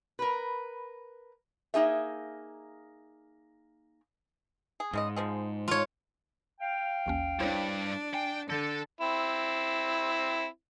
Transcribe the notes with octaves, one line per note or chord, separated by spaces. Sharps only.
A#4 B4
A#3 D#4 G#4 E5
G#4
G#2 C#3 G#3 D#5
C#3 F3 G#3
D3 F4 C#5
F5 G5
A1 D#2 C#4
G2 D4 E4 C5 C#5
G5 G#5 C7
D3 D4 A4 G6 A6
C4 E4